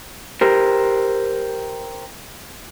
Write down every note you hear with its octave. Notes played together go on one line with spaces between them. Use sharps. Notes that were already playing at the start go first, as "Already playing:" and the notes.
G4 A#4 C5